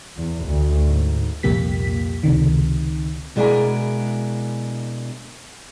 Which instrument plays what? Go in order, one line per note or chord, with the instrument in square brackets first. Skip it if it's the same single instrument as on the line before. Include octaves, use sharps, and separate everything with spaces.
[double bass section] E2
D2
G#2
[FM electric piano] C2 F2 A#2 A#3 G4 B6
C#2 C3 D#3
[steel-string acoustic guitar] B2 G#3 D4 E4 A#4 G#5